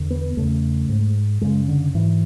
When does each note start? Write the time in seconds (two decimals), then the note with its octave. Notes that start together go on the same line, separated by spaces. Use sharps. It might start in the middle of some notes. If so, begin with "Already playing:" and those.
Already playing: E2 D3
0.10 B3
0.37 E2 C#3 A3
0.89 G#2
1.41 F#2 C#3 G#3
1.68 D3
1.94 G#2 E3